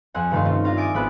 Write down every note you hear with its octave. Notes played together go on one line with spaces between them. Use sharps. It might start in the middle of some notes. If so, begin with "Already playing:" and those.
F2 C4 F#5 G#5
G2 C3 D#3 A3 F5 C6
C4 C#4 F4
D4 F4 F5 A#5 C6
E5 G#5 D6 D#6 A6 D7
G#1 B3 C4 F4 B5 F#6